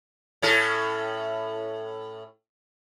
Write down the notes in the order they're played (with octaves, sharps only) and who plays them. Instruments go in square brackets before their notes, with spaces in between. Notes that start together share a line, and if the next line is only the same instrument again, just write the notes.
[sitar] A2 C#4 A4